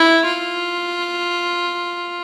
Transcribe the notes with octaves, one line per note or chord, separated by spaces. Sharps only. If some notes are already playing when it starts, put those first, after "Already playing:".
Already playing: E4
F4